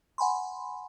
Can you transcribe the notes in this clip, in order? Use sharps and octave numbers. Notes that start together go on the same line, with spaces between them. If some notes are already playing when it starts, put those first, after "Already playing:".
F#5 G#5 B5 C6